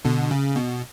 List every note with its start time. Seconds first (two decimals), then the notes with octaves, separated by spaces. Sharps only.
0.05 B2 D3
0.31 C#3
0.56 B2